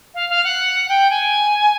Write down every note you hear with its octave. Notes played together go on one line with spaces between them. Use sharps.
F5
F5
F#5
G5
G#5